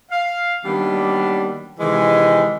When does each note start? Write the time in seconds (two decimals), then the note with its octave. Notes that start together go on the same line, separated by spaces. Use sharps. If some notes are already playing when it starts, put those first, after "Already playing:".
0.11 F5
0.65 D#3 F#3 G3 A#3 B3 D4
1.79 C3 D#3 E3 G#3